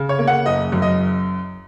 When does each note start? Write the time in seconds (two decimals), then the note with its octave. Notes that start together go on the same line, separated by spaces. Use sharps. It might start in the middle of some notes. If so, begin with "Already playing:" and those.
Already playing: C#3
0.09 C#5
0.19 A#3
0.27 F#5
0.46 F#1 D#5
0.72 F#2
0.82 D#5